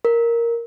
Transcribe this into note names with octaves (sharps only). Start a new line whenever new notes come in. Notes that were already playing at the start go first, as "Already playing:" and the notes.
A#4